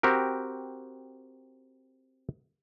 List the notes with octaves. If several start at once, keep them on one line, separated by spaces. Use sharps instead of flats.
C4 F#4 G4 A#4